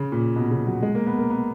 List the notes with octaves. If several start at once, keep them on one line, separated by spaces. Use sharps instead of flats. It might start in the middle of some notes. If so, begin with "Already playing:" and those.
Already playing: C#3
A#2
B2
C#3
F#3
G#3
A#3
B3
A#3
B3